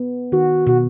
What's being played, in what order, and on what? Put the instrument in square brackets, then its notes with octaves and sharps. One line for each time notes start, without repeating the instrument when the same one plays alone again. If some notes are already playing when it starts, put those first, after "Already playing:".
Already playing: [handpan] B3
[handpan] D#3 [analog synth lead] F#4
[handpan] B2 [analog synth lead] F#4